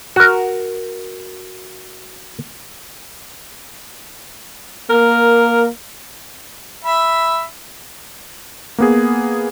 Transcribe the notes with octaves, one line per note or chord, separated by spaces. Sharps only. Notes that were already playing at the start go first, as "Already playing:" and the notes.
F#4 A#4
A#3 A#4
E5 B5
A#3 B3 G#4